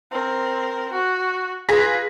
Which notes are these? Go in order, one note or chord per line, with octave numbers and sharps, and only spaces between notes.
C4 A#4
F#4
F4 G#4 B4 A#6 B6